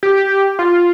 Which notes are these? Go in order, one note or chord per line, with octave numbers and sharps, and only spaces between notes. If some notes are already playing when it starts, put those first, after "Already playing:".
G4
F4